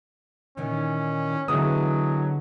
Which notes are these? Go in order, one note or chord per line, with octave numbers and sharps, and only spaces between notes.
A#2 D#3 E3 C#4
D3 E3 F#3 G#3 B3 D#6